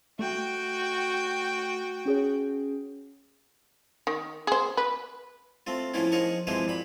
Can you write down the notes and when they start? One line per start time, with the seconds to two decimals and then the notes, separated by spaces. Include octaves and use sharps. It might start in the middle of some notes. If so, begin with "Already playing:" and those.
0.19 A3 F#4 G5
2.05 C#4 G#4 C#5
4.07 D#3
4.47 G#4 C5
4.77 B4
5.67 A3 C4 F4
5.94 A2 F3 A3 B3 C#4 E4
6.12 F3 D#4 G#4 A#4 C#6
6.47 C3 E3 F3 G#3 E4 B4
6.68 A#2 B5